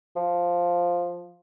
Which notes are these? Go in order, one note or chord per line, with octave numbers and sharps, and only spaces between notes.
F3